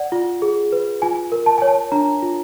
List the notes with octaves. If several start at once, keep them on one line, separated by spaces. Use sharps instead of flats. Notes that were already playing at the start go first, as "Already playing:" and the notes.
Already playing: D5 F#5
F4
G#4
B4
F4 G#5
A#4
A5
C#5 G#5
A5
D4 A#5
F4